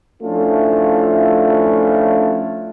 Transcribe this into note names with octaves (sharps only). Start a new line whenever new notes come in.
F3 A3 C#4 D4 E4 F4